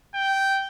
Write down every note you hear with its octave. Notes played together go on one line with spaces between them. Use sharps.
G5